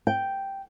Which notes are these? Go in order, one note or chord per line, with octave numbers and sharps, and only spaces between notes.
G5